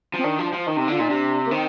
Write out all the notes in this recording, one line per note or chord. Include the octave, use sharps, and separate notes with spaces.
F3
C4
D#3 D4
F3
F3 F4
D#3 D#4
C3
D3 F4
A#2 D#4
C3 D4
A#3
D#3 C4